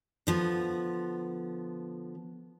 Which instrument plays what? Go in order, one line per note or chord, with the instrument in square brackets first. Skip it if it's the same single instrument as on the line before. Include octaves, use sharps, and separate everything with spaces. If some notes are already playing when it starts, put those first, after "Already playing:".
[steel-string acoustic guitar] D3 F3 B3